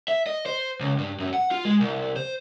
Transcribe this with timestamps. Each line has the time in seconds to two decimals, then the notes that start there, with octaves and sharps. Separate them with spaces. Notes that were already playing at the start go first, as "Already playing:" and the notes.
0.08 E5
0.27 D#5
0.46 C5
0.80 C#2
0.98 G2
1.20 F#2
1.34 F#5
1.51 F4
1.65 G#3
1.80 C2
2.16 C5